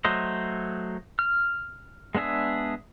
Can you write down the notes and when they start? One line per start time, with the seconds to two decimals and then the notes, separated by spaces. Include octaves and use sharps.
0.05 F#3 A3 C5 D#5
1.19 F6
2.15 G#3 B3 D4 G#4 E5